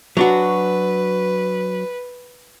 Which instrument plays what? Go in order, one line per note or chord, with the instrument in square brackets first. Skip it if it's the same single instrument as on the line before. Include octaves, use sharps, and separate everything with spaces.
[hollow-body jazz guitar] F#3 D4 F#4 [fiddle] B4